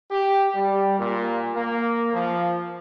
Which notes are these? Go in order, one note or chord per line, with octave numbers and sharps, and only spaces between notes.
G4
G3
A#2
A#3
F3